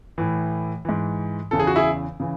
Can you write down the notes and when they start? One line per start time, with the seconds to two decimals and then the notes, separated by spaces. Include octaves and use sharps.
0.18 A2 E3
0.85 G#2 E3
1.51 E2 C#3 E3 A4
1.59 G#4
1.67 F#4
1.76 E4 G#4
2.20 C#3 E3